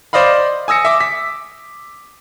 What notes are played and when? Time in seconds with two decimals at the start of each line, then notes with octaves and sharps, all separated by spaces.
0.13 C5 D5 D#5 F5 B5
0.68 G#5 D#6 E6 A#6 C#7
0.85 E5 D6
1.01 B6